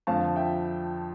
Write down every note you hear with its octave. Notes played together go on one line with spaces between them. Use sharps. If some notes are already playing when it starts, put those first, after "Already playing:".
F2 D3 F3 F5 A5
E5 G5